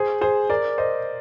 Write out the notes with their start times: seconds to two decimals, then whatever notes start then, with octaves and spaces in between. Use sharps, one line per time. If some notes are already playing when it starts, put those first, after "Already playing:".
Already playing: G#4 C5
0.21 G#4 C5
0.49 A#4 D5
0.78 C5 D#5